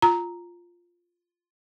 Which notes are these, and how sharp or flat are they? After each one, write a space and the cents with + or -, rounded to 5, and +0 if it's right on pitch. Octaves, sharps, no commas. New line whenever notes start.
F4 +0 A#5 +0